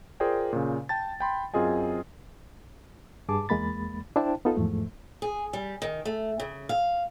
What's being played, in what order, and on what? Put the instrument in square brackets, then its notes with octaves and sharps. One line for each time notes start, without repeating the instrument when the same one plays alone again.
[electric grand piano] F4 G#4 A#4 C5 D5 G5
A#2 C#3
G5 A5 A6
G5 B5 C6
F#2 C4 F4 G#4 D#5 G#5
[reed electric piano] G2 G#4 A5 D6
E2 G#3 A#3 B5 A6
D4 E4 C5 G5 A5
B3 D#4 F4 A4
E2 G#2 F3 A3
[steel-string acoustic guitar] G#4
G3
D#3
A3
C#3
F5